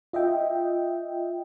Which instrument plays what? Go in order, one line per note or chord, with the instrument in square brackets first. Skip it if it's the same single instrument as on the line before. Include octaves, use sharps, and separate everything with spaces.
[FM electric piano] F4 D#5 E5 G5